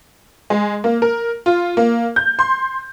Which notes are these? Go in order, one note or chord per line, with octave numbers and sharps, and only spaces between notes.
G#3
A#3
A#4
F4
A#3
G6
C6